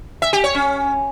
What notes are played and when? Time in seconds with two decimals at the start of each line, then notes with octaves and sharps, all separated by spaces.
0.22 E5
0.33 G4
0.44 C#5
0.55 C#4